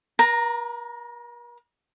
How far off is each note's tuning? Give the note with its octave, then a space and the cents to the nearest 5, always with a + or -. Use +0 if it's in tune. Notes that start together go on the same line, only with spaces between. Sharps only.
A#4 +45 A#5 +0